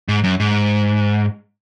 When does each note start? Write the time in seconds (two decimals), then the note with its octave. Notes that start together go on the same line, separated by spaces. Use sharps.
0.08 G#2
0.24 F#2
0.40 G#2